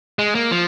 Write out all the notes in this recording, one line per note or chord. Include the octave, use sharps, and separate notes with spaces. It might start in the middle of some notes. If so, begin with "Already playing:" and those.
G#3
A#3
F3